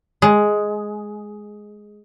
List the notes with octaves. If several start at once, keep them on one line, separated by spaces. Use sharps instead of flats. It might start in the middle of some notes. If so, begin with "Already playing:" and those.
G#3